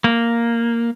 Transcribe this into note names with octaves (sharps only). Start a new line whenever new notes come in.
A#3